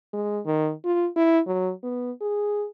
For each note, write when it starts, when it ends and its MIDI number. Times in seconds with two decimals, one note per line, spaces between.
0.13 0.40 56
0.46 0.72 51
0.84 1.08 65
1.16 1.40 64
1.47 1.71 54
1.83 2.12 59
2.21 2.66 68